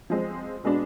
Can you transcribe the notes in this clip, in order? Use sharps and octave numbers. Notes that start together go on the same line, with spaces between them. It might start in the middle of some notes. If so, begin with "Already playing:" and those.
F3 G#3 C4
B2 G#3 B3 D4